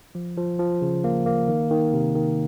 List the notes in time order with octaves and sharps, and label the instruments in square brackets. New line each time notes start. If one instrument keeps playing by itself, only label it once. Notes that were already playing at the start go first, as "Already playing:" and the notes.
[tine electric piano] F3
F3
F3
C#3
A#3
A#3
D#3
D#3
C3
D#3